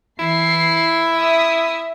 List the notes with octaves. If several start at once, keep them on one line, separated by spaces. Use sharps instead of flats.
E3 E4 C7
E5 D#6